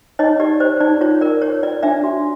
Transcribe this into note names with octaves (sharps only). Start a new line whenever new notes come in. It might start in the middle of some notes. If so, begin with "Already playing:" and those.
D#4 C#5 D#5
G4 D5
C5 D5
D#4 D5
F4 C#5
A#4 D5
C#5
F4 D5
D4 D5 E5
F#4